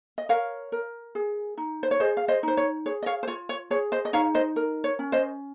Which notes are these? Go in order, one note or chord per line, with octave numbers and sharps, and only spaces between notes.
D#5
A#4 C#5 F5
A#4
G#4
D#4
C5
C#5
G#4 C5 D#5
F5
C5 D#5
D#4 C5
C#5
G#4 C#5
D#5
C#5 F5
C5
F4 C#5
C#5
G#4 C#5
C5 D#5
D#5
D#4 C#5 F5
C5 D#5
A#4
C#5
C#4
C5 D#5